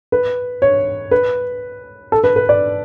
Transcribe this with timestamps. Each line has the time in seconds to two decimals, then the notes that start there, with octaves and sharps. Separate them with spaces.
0.12 B4
0.62 C#5
1.11 B4
2.12 A4
2.24 B4
2.36 B4
2.49 D5